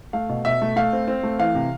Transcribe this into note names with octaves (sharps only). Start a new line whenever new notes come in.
A3 F5
B2
B2 E5
A3
A3 F5
C4
C4
A3
E3 F5
C3